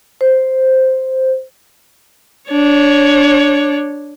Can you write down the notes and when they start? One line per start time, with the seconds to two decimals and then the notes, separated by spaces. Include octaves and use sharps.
0.21 C5
2.51 D4 C#5